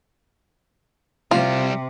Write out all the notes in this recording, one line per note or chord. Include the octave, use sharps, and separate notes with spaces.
C3 G3 C4 F4